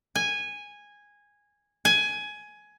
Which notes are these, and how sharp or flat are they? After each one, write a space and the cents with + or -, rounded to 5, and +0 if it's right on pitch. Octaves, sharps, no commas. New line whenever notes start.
G#5 -10
G#5 +15